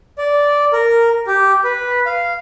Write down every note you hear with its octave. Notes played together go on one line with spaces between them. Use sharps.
D5
A#4
G4
B4
F5